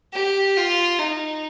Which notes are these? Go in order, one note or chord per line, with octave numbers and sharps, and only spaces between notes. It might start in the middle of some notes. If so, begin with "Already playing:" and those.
G4
F4
D#4